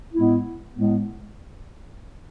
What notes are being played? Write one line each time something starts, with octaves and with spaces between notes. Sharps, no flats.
A2 G#3 B3 E4
A2 G#3 B3